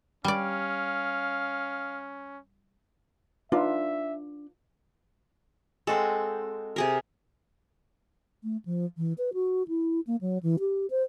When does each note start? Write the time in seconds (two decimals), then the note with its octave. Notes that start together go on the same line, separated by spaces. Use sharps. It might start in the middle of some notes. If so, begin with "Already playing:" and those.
0.24 G3 C#4 D5 F5
3.52 D4 D#4 F4 B4 E5
5.87 G#3 C4 F#4 A4
6.76 C3 G#4 A#4
8.43 A3
8.65 F3
8.98 E3
9.18 B4
9.34 F#4
9.68 E4
10.07 A#3
10.21 F#3
10.43 E3
10.59 G4
10.90 C5